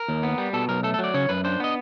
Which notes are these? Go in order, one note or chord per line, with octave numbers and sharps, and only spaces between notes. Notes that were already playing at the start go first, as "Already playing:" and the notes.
Already playing: A#4
D#2
B3
G3
B2 A4
B1 A#4
A3 A4
A4
F#3
D5
C#3 C#5
F#2 B4
D4 C5
B3 D#5